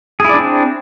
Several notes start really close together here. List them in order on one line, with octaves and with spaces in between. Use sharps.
G#4 E4 D5 D4 C4